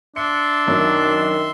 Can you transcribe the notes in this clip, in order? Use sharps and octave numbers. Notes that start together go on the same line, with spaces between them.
D4 E5 C6 C#7
F#2 D#3